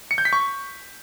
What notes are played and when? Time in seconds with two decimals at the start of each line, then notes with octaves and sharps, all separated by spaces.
0.11 C#7
0.18 G6
0.25 B6
0.33 C#6